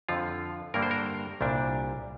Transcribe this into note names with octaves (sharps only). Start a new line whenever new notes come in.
F2 D3 F3 F4
G2 D3 G3 A#3 D4 A#4
C5
A#4
C2 A#2 G3 D4